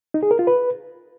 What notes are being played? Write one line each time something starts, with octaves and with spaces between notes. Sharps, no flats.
D#4
G#4
A#4
F4
B4